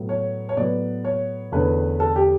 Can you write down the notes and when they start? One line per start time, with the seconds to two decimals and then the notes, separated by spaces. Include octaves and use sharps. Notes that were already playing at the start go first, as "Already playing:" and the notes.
Already playing: A2 F#3 B3
0.09 C#5
0.49 C#5
0.56 A2 F#3 B3 D5
1.05 C#5
1.52 E2 D3 A3 C#4 B4
2.00 A4
2.16 G4